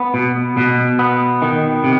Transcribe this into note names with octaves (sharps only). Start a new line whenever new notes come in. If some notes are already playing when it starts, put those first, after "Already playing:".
Already playing: B3
B2
B2
B3
D#3
C3